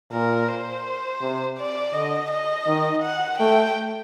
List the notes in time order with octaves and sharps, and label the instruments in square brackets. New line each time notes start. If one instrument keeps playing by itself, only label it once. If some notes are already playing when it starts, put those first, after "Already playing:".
[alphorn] A#2 [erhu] A#4
[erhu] C5
[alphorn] C3
[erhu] D5
[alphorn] D3 [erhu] D#5
[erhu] D#5
[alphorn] D#3
[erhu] F#5
[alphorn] A3 [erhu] G5